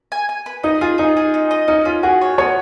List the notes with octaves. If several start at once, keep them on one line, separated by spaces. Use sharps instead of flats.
G#5
G#5
B4
D#4 D#5
F4 G#4
D#4 G#4
G#4
D#4
D#5
C#4 D#4
C#4 F4
F#4 G#4
C#5
B3 C#5